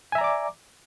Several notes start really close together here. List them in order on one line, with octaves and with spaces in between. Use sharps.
G#5 E5 A#5 D5 D6